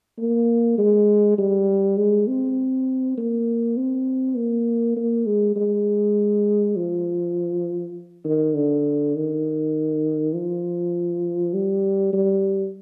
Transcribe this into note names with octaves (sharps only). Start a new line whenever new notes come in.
A#3
G#3
G3
G#3
C4
A#3
C4
A#3
A#3
G#3
G#3
F3
D#3
D3
D#3
F3
G3
G3